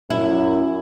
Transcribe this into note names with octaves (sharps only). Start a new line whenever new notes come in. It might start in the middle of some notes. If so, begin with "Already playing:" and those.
F#2 E4